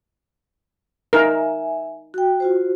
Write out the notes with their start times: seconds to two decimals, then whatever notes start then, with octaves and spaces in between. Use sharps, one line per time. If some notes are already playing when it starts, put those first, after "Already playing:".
1.13 D#4 A#4 E5 G#5
2.14 F#4 G5
2.40 F4 F#4 C5